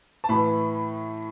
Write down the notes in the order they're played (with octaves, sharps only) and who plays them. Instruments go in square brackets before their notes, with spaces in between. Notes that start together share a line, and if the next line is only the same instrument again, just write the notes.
[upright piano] A5
A2 E3 B5